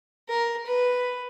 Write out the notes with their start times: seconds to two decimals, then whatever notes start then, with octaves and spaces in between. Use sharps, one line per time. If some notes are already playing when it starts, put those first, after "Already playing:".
0.29 A#4
0.66 B4